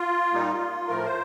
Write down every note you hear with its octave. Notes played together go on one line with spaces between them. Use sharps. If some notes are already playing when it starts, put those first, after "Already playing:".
Already playing: F4
A#2 G3 A#3 D#4
A2 F3 A3 A#4
C5